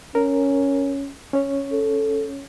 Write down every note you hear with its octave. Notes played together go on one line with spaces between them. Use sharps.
C#4 A#4
C#4 C#5
A4